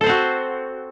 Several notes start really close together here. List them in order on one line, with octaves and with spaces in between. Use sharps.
A4 C5 C4 F#4